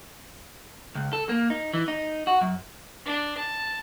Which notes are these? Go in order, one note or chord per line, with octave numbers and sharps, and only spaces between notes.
C#2
A4
A#3
D#4
E3
D#4
F#4
F#2
D4
A5